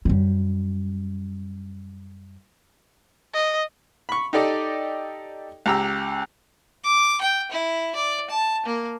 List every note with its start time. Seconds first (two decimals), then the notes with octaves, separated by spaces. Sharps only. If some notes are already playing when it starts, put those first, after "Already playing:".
0.05 F#2 G3
3.34 D#5
4.09 B5 C#6
4.33 D#4 G4 A4 D5 D#5
5.66 C#2 G4 A#5 E6
6.84 D6
7.21 G5
7.52 E4
7.95 D5
8.30 A5
8.66 A#3